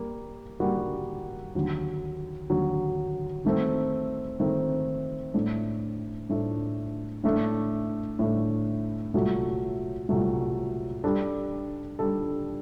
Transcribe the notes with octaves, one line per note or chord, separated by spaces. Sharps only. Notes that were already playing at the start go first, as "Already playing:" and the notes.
Already playing: G3 A#3
G3 A#3 F#4
D#2 D3 F#3
D#2 D3 F#3
D#3 A3 C4
D#3 A3 C4
A2 A3 D4
A2 A3 D4
A2 A3 D4
A2 A3 D4
C2 A#2 F#3 A3
C2 A#2 F#3 A3
G3 D4 A4
G3 D4 A4